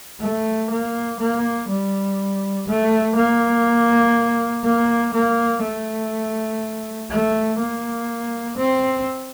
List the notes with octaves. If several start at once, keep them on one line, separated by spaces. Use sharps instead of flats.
A3
A#3
A#3
G3
A3
A#3
A#3
A#3
A3
A3
A#3
C4